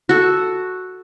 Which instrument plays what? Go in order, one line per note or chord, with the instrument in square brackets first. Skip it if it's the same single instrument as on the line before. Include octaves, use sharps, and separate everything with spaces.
[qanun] F#4 A4